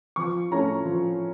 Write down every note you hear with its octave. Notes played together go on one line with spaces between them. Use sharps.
F3 C#6
A3 C#4 E4 A#5
F3